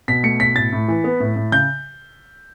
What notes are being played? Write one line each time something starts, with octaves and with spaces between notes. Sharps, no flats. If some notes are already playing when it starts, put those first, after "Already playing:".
B2 B6
A3 C#7
B2 B6
A2 A6
A2
E3
B3
A2
A2
C#3 G6